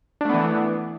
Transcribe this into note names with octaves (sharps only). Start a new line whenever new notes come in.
E3 A3 B3 D4